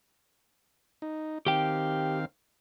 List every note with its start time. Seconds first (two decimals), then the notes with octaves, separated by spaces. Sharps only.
1.02 D#4
1.47 D#3 C4 G4 F5 G5